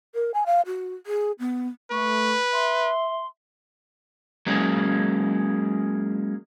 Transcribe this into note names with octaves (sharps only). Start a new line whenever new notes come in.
A#4
G#5
F5
F#4
G#4
B3
A3 B4 C#6
E5 C6
F#3 G#3 A#3 C#4